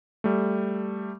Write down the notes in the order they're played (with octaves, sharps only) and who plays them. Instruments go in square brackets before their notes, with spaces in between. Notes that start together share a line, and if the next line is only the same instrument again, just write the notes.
[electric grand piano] G3 A3